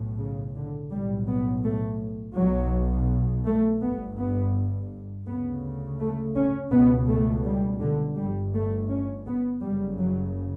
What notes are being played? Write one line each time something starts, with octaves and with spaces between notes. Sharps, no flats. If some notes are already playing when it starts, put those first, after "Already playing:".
Already playing: B1 A2
C#3
D3
B1 A2 G3
B3
A3
B1 B2 F#3
A3
G1 G2 B3
B3
D2 C#3 B3
A3
C#4
C#2 B2 B3
A3
G3
D3
G1 G2 G3
A3
C#4
B3
F#1 F#2 C#3 G3
F#3